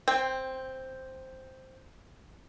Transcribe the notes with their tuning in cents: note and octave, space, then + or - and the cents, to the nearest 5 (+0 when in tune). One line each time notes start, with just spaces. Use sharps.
C4 +0 G5 +25